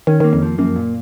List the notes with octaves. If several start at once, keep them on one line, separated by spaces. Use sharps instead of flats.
D#3 C#4
D#3 A#3
F2
F3
F#2 A#3
A#2